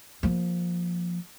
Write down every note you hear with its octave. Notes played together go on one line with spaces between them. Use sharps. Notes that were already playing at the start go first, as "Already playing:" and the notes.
F3 A#3